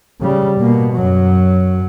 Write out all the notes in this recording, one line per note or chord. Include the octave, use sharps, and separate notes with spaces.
C#3 G3
B2 A#3
F#2 F#3